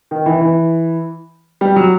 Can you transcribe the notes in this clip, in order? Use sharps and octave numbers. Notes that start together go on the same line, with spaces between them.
D#3
E3
E3
G3
F#3